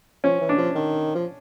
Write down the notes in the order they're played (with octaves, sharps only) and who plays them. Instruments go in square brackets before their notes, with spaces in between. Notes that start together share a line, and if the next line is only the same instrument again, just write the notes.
[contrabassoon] F3 [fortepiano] C#4
[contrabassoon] E3
[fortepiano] D4
[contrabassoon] F3
D#3
F3